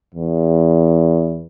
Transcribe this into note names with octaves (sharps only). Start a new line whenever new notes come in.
E2